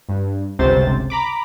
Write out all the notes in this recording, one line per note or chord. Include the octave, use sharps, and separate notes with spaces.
G2
G1 C#2 C3 C5 A6
A#5 B5 D6